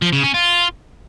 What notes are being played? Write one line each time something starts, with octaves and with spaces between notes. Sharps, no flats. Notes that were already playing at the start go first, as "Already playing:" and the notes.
F3
C#3
C#4
F4